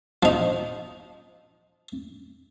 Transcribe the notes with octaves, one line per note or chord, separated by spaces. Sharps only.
F3 D#4